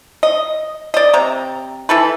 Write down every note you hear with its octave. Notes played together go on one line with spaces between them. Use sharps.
D#5
D5 D#5
C3 A#5
E3 E4 A4 B4